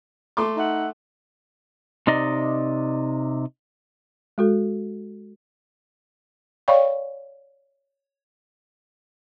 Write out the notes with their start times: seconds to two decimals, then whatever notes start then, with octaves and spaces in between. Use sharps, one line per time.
0.37 A3 C6 D6
0.57 D#4 E5 F#5
2.07 C3 D#4 D5 D#5
4.38 G#3 F#4 A4
6.68 C#5 D5 F5 G5 B5 C#6